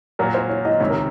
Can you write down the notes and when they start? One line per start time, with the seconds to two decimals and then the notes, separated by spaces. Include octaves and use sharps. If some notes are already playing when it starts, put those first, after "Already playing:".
0.19 A#2 F#3 A#3 A#4
0.34 C5
0.49 C#5
0.65 D#5
0.80 C#2 C3 D#3 C#5
0.90 A#4